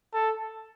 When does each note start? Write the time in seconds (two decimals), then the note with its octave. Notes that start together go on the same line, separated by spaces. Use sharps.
0.14 A4